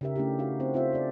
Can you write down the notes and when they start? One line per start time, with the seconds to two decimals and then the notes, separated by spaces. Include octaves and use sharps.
0.01 C#3 D#4 G4 A#4 E5
0.16 A3 C#4 D4 E4 G4
0.39 D#4 F#4 F5
0.60 C4 D#4 C5 F#5
0.74 C4 F4 C5 E5
0.93 F4 A4 D5